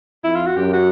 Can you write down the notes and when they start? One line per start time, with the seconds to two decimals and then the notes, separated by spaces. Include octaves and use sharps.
0.24 F2 E4
0.36 F4
0.46 F#4
0.57 F#2 G4
0.73 F#4